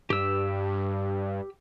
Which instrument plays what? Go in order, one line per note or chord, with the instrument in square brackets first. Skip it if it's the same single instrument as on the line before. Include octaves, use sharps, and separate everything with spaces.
[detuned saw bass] G2 [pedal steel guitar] G4 E6